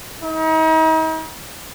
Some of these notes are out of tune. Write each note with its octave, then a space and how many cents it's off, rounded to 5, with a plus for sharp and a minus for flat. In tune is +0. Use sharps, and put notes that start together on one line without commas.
D#4 +40